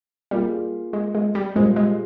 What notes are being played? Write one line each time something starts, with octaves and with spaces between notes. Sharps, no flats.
G3 A#3 F4 G#4
G#3
G#3
G3
A#2 G3 G#3 A#3 F4 C5
G#3